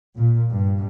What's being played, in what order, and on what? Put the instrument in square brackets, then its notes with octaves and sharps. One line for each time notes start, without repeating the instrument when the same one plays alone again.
[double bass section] A#2
G2